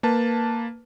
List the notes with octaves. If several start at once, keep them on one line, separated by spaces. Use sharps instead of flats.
A#3 B4 A5